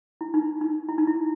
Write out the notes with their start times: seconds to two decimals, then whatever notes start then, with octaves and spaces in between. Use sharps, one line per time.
0.21 E4
0.34 D#4
0.61 D#4
0.88 E4
0.98 D#4
1.07 E4